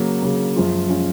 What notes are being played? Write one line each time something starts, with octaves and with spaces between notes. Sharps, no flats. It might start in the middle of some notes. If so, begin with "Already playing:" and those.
Already playing: C#3 F#3 A#3
C#3 F#3 A#3
F#2 F3 G#3 C#4 F4
F3 G#3 C#4 F4